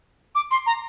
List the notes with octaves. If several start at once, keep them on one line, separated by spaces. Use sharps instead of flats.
D6
C6
A#5